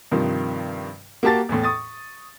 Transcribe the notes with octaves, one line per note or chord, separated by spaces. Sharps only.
G2 C3 D#3 F3
A#3 F#4 G4 A5 A6
E2 A2
C#6 D#6 A6